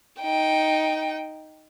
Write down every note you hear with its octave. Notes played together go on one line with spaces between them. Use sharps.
D#4 G5